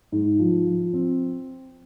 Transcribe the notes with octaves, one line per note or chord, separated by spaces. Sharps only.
G#2
F3
F3
C4